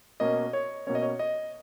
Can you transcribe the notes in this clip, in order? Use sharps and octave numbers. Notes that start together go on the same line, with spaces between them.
B2 A#3 C#4 D#5
C#5
B2 A#3 C#4 C#5
D#5
C#5
D#5